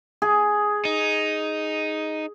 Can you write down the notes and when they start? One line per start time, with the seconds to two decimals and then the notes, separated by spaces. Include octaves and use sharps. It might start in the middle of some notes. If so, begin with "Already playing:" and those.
0.22 G#4
0.85 D#4